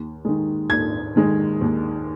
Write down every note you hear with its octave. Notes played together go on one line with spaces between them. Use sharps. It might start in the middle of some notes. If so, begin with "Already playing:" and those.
Already playing: D#2
D#3 G#3
D#2 G#6
D#3 G#3
D#2